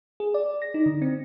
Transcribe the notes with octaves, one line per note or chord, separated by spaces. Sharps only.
G#4
D5
A#6
D#4
D3
C4